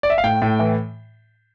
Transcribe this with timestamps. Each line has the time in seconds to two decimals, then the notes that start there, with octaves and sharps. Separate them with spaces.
0.03 D5
0.10 E5
0.18 F5
0.24 A2 G5
0.42 A2
0.59 E3